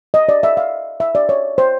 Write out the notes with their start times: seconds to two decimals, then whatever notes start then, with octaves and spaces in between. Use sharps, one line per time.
0.14 D#5
0.29 D5
0.43 E5
0.57 F5
1.00 E5
1.15 D5
1.29 C#5
1.58 C5